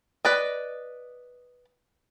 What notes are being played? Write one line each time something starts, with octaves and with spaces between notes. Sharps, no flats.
B4 D5 D#5